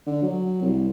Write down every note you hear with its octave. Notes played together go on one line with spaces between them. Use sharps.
D3
F#3
C2